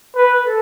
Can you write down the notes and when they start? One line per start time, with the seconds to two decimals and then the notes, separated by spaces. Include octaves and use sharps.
0.15 B4
0.36 B4
0.45 A4